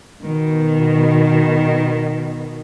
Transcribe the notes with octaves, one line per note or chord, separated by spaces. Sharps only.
B2 D#3